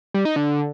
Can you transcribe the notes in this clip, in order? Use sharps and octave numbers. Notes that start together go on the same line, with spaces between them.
G3
D#4
D3